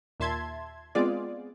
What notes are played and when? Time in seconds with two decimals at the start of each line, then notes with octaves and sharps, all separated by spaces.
0.20 D#2 A#2 E5 A5 C6 G#6
0.95 G#3 B3 C4 F4 G#4 D5